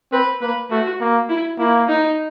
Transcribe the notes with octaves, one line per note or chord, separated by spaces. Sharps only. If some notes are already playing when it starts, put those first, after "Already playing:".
C4 B4
A#3 B4
A3 F#4
A#3
E4
A#3 E4
D#4